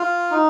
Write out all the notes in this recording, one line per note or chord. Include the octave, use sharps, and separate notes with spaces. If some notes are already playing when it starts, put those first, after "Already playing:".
Already playing: F4
D#4